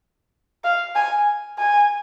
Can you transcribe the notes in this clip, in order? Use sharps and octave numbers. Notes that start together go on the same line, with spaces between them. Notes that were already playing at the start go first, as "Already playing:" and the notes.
F5
G#5
G#5